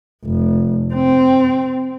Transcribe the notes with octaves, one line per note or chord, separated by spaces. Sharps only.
F1
C4